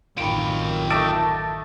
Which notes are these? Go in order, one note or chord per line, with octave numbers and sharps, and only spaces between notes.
A1 F#2 D#3 F4 G4 B5 C#7 D7
A3 D#5 A5 D6 E6 D7